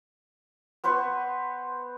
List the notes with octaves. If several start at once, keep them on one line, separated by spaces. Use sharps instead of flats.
B3 B4 C5 C#6